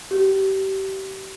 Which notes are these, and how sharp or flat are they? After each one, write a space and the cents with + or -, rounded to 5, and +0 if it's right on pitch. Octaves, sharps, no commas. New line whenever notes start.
G4 -30